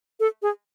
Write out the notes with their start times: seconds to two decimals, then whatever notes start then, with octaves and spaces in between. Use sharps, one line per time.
0.20 A4
0.42 G#4